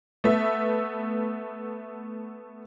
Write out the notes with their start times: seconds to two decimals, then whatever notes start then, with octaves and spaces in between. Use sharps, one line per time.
0.24 A3 B3 E5